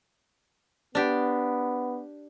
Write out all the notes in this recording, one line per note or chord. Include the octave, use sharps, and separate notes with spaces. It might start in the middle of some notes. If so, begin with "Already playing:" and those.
B3 D4 G4